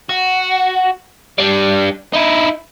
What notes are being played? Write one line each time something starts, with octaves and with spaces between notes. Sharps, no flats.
F#4
G3 D4
D#4 E4